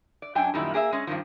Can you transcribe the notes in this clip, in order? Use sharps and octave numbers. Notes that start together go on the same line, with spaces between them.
D5
F#2 D4 G5 G#5
F#2 A#2 D#3 G3 E4
A#3 G#4 D5 E5
G#3 C#4
G2 D#3 F3